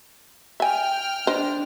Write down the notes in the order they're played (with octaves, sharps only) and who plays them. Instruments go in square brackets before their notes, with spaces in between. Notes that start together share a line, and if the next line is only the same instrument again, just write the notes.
[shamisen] E5 G#5 [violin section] G5 F6
[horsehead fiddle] D4 [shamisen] B4 C5 D#5